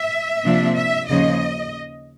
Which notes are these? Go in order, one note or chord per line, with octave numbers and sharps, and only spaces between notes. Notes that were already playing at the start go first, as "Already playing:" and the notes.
Already playing: E5
C3 F3 A#3 D4
E5
D#2 C#3 F3 D#5